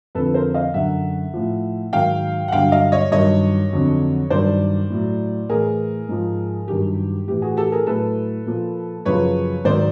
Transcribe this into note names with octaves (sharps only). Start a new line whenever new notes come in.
F2 D3 F3 A4 B4
A#4 C5
D#5 F5
F#2 D3 F#3 E5 F#5
A2 F3
G#2 D#3 F#3 F5 G5
F#5
G2 D3 F#3 F5 G5
D#5 F5
C#5 D#5
G2 D#3 F#3 C#5 D#5
F2 D3 F#3
G2 D#3 F#3 C5 D5
A2 F#3
A2 E3 G#4 A#4
G#2 F3
G2 D#3 F#3 G4
A2 E3 G4
F#4 G#4
G4 A4
G#4 A#4
A2 F#3 A4 B4
A#2 F3
F#2 C#3 F3 B4 C#5
G#2 D#3 F#3 C5 D5